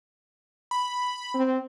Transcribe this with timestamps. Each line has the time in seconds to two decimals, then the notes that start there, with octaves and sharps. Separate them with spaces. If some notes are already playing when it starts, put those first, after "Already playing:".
0.71 B5
1.34 C4